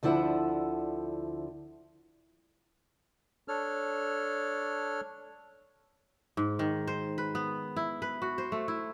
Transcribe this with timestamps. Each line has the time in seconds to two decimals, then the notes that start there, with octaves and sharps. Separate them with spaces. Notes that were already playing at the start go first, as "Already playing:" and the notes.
0.03 D2 D3 F3 E4 F#5
3.48 D4 A4 C#5 F6
6.37 G#2
6.59 D#3
6.87 C5
7.18 B4
7.35 B3
7.77 E4
8.02 B4
8.22 F#4
8.38 C5
8.52 A3
8.68 E4